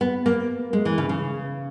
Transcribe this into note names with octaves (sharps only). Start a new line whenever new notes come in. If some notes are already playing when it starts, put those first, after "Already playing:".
B3
A#3
G#3
E3
C#3
C#3